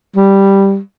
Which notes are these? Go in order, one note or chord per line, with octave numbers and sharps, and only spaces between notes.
G3